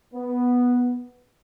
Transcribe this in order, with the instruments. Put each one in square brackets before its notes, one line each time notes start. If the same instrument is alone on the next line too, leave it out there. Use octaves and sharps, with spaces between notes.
[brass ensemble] B3